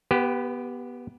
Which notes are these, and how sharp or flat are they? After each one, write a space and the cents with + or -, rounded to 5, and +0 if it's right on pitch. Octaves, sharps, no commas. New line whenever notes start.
B3 -15 G4 +0 B4 +35